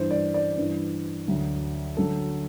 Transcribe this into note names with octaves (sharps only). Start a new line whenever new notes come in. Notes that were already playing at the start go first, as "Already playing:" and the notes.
Already playing: G2 E3 C5
D5
D5
G2 E3
D2 D3 F#3
D2 D3 F#3 A4